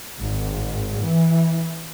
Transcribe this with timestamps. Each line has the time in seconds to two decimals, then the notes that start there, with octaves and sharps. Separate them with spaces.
0.21 G#1
1.00 E3